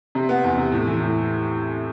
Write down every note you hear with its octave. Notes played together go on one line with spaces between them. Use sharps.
C3
B3
E2
C3
A2
E3
A2